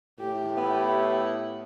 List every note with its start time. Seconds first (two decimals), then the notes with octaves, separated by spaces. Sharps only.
0.19 A2 G4
0.57 B3 E4